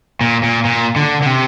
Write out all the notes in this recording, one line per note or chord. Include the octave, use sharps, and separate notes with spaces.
A#2
A#2
A#2
D3
D3
C3